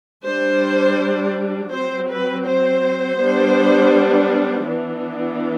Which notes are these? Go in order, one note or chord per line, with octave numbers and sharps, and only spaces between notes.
G3 D4 C5
F#3 C4 C5
B4
C5
G3 B3 D4
E3 B3 D4